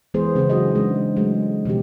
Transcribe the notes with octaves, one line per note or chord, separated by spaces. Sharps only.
E3 G#3 B3 G#4 C5
C#3 C4 E4 G#4
F#3 D#4 F#4 G#4 D#5
G#3 C4 D4
F#3 G#3 A3
B2 D#3 F3 G4